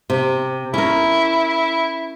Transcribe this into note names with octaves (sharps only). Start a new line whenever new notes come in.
C3
C#4 E4 A#4